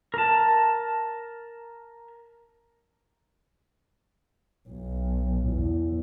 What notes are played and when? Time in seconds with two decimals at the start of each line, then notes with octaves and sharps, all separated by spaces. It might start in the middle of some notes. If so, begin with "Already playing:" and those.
0.14 A#4 A5
4.69 B1
5.48 E2